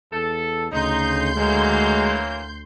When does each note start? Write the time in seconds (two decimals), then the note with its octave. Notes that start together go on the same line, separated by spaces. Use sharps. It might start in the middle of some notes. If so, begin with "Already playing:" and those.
0.13 E2 A4
0.72 D2 C#3 D#4 C6 G6
1.37 E3 F#3 G#3 A#3